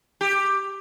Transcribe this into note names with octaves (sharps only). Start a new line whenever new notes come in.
G4